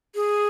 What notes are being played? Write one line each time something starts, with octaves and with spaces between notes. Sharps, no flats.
G#4